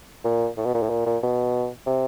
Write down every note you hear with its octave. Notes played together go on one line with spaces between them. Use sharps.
A#2
A2
B2
A#2
A2
A#2
A#2
B2
C3